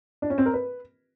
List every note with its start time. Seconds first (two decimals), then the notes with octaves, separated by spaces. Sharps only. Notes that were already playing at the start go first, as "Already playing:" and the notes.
0.22 D4
0.30 C#4
0.38 C4
0.46 A#4
0.54 B4